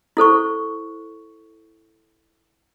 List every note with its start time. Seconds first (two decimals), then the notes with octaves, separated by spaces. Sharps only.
0.17 E4 A4 C5 C#6